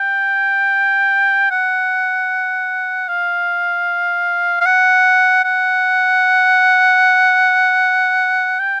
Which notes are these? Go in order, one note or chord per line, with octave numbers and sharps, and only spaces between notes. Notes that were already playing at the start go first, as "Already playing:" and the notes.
Already playing: G5
F#5
F5
F5
F#5
F#5
G5